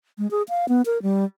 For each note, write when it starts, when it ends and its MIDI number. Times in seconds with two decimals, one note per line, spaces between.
0.18 0.29 56
0.31 0.42 68
0.49 0.68 77
0.68 0.82 59
0.86 1.01 70
1.02 1.25 55